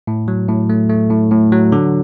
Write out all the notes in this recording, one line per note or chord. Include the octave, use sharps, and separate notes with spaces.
A2
F#3
A2
A3
A3
A2
A2
F#3
D3